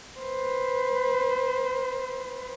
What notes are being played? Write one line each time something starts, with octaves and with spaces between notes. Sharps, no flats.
B4 C5